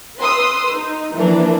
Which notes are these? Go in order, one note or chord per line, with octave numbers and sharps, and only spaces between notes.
B4 C6 D#6 E6
D#4
E3 F3 A#3 D4